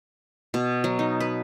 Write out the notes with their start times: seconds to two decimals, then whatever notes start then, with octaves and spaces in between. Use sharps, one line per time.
0.54 B2
0.84 F#3
0.99 D#4
1.20 B4